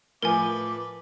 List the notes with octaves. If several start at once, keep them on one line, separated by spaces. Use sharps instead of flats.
A2 F3 A#4 B4 G#5 D6